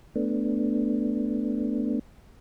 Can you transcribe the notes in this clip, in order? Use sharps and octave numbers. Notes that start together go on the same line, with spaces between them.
A3 B3 D4